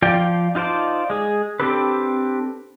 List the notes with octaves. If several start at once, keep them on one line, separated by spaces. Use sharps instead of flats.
F3 F4 D5 G5
D#4 F4 C5 D5 A5
G#3 G#4
C4 D4 G4 A4 B4